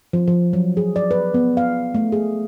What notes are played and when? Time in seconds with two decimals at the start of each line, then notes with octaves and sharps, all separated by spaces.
0.13 F3
0.27 F3
0.53 F#3
0.77 G#4
0.96 D5
1.11 B4
1.34 B3
1.57 F5
1.95 A3
2.12 G#4